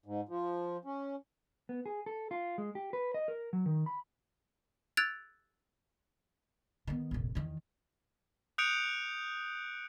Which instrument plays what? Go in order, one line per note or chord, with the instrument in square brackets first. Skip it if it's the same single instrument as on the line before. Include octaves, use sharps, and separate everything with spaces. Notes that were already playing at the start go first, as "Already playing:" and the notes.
[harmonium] G#2
F3
C#4
[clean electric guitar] B3
G#4
A4
F4
G#3
G4
B4
D#5
A#4
F#3
D#3
B5
[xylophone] E6 F#6 G#6 A6 D7 F7
[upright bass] D#3 B3
F1 A#1
E2 D#3
[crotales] D#6 F#6 G6 C#7 D7 F7